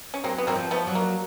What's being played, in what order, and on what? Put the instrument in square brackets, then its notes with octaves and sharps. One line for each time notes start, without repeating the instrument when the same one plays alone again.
[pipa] C#4
[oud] F#3 [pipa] A#3 C4
[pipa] B3
[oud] F#3 [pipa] A#3 C4
[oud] F3
[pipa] A3 B3
[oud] F#3
[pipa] A#3